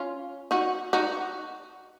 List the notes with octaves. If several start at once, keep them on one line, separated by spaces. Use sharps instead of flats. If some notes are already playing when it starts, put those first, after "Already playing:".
Already playing: C#4 F4
D#4 F#4
D#4 F#4